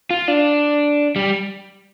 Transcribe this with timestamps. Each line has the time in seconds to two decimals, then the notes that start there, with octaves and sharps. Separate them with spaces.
0.11 F4
0.28 D4
1.16 G3